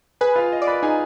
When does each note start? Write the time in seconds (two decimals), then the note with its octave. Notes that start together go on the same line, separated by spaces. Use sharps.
0.21 G#4 B4 G#5
0.36 F4 F5
0.52 D#5
0.62 D5
0.67 B4 B5
0.83 D#4 G#4 G#5